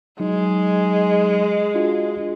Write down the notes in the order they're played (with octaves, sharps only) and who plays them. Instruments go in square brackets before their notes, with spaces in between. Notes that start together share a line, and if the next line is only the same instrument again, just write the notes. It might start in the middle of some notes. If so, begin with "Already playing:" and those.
[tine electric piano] F#3 D#4 [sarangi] G#3
[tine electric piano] D4 F4 F#4